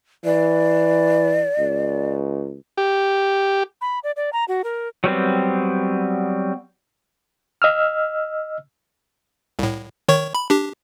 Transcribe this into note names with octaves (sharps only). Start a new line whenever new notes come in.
E3 D5
C#2
G4
B5
D5
D5
A#5
F#4
A#4
F#3 G3 B3 C4
D#5 E6 F6
C2 A2
D#3 C#5 C#6
B5
D4 G4